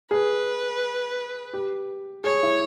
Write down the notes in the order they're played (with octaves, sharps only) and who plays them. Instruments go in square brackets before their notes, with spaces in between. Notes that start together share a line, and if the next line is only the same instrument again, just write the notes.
[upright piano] G#4 [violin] B4
[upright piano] G4
[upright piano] G#4 [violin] C#5
[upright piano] E4